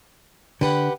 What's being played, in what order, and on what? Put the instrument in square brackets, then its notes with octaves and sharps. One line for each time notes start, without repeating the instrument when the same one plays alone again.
[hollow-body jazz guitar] D3 [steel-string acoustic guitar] G4 B4 F#5